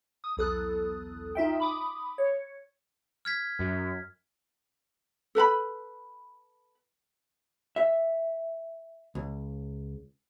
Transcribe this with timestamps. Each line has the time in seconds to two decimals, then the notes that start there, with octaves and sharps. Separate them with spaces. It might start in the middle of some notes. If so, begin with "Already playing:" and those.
0.24 D#6
0.37 B1 E2 A4 D#6 F#6
1.35 D#4 F4 E5 G5
1.60 B5 D6 D#6
2.18 C#5
3.25 F6 G#6 B6
3.59 F#2
5.35 A4 B4 A#5 B5
7.76 E5
9.15 C#2